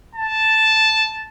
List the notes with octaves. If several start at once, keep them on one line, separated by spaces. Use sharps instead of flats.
A5